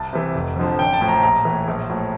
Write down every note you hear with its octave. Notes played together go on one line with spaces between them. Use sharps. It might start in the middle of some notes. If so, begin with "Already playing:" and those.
Already playing: C2 A5
C3 E3
F1
F2 D3 F3
A1 G5
A5
A2 F3
A#5
A#1 A#5
A2 E3
A#1
A2 F3